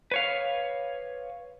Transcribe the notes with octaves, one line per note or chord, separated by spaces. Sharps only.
B4 C#5 F5